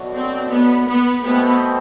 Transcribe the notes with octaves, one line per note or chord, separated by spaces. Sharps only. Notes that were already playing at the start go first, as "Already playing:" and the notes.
Already playing: B2 F#3 A3 D4 F#4
C4
B3
B3
B2 A3 B3 C4